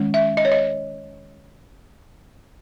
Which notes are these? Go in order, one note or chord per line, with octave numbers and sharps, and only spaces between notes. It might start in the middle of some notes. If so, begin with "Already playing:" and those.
Already playing: D#3 G#3 C#4
E5
D#5
C#5
D#5